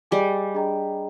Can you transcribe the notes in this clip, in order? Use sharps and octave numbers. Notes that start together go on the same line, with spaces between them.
G3 G#4 D#5 G#5 D6
D4 G#4 D#5 G5 A#5